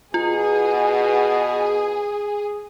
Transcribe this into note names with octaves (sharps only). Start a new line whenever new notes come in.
B2 F4 G#4